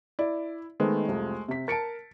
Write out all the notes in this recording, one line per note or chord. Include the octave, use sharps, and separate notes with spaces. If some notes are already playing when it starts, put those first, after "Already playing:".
E4 D5
D#3 G#3 A3 B3 C5
C2 F2
C3 B6
A#4 A5 A6 C#7 D7